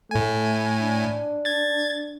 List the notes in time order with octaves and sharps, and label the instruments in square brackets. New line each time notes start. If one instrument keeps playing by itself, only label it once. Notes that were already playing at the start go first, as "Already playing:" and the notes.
[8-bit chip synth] A2 G#5 [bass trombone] A3
[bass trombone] D4
[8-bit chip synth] G#6 A6